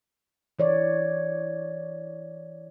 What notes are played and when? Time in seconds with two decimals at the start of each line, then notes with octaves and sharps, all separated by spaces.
0.59 E3 C#5 D5